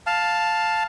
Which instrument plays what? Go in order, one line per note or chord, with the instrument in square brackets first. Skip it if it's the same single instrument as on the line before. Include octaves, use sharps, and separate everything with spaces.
[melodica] F5 A5